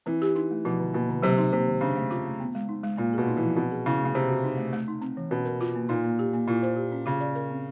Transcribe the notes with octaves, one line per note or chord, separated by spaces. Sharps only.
E3 C4
G4
D#4
A3
B2 F3
D3
B2 A#3
D3
C3 F#3
D#4
C3 A#3
D#3
C#3 D4
A3
F4
A3
B3
G#3
D#4
G#3
A#2 A#3
B2 G#4
D#4
E3
F3
B2 C4
G#4
C#3 E4
C#3 A3
C3 C4
F#4
D#4
A3
A3
D#4
C4
E3
B2 C#4
A#4
F4
A#3
A#2 D#4
A#3
G4
A#3
A#2 E4
C5
G4
C#4
C#3 F4
D5
A#4
C4